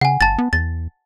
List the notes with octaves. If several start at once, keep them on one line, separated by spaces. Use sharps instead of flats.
C#3 F#5 G#5
G1 A5 A6
B3
E2 A6